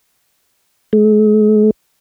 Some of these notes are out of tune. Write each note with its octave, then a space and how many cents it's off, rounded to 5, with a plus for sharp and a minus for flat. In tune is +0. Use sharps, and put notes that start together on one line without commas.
G#3 +45